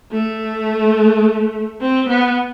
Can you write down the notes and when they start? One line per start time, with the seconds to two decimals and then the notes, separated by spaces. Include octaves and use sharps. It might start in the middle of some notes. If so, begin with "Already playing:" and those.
0.11 A3
1.81 C4
2.09 B3